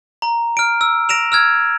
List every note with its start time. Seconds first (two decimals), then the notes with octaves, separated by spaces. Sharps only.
0.22 A#5
0.57 F6 D7
0.81 E6
1.09 A#6 D7 E7 F7
1.32 E6 F6 G#6